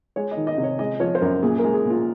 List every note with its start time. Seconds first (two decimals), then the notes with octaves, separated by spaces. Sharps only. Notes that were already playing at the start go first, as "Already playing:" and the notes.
0.16 G#3 C#5
0.31 D#5
0.37 D#3
0.47 D#5
0.58 C3
0.63 C#5
0.79 G#3 D#5
1.00 F3 C#5
1.15 C5
1.21 F#2 A#4
1.43 A#2 G#4
1.59 G#3 A#4
1.74 G#4
1.85 A#2
1.90 F4